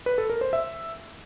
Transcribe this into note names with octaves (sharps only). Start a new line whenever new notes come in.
B4
A4
A#4
C5
E5